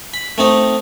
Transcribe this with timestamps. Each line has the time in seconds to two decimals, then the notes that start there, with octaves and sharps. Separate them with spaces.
0.14 B5
0.38 A3 C4 D#4